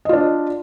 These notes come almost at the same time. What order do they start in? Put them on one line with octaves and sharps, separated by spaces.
D#5 F4 D4